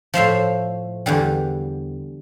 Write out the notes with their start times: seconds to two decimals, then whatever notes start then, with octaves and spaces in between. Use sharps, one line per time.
0.14 A2 F3 C5 E5
1.06 E2 D3 G3